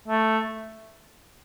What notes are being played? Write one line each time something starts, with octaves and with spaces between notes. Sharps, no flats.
A3